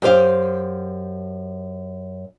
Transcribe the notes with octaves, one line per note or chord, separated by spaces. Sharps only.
F#2 G4 C5 F5